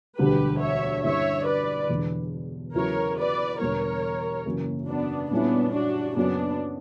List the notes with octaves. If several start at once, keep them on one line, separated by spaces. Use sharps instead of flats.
E1 D2 D3 G3 G4 B4
C#5 E5
G2 D3 G3 C#4 E4 C#5 E5
B4 D5
E1 E2 D3
E2 C#3 F#3 B3 E4 A#4 C#5
B4 D5
E1 E2 D3 G3 B3 A#4 C#5
F#1 F#2 E3 A#3 C#4
B3 D4
A#2 G3 B3 C#4 D4 E4
D4 F#4
F#2 C#3 F#3 A#3 B3 C#4 D4